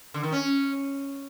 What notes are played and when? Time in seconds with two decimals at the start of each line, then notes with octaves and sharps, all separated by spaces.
0.14 D3
0.23 D#3
0.32 C#4